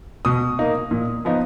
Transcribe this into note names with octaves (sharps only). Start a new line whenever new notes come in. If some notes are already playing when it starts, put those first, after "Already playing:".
B2 D#6
A#3 D#4
A#2
F3 B3 D#4